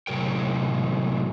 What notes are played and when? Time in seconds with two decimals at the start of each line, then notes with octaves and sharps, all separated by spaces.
0.07 A2 C3 F#3 A#4 G5